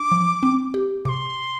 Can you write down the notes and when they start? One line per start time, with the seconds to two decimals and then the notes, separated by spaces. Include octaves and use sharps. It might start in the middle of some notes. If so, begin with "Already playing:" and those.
Already playing: D4 D6
0.12 F3
0.43 C4
0.74 G4
1.05 C3 C6 D6